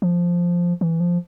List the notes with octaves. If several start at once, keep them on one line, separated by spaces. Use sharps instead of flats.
F3
E3
F3